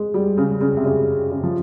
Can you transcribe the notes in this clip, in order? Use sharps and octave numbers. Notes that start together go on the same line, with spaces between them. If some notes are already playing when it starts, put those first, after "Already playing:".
Already playing: G#3
G3
C#3
C#3
C3
C#3
C#3
F3